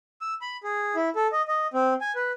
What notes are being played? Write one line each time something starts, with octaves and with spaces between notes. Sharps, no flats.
E6
B5
G#4
E4
A4
D#5
D#5
C4
G#5
B4